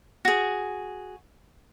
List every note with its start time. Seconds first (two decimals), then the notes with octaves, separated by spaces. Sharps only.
0.25 F#4 G#4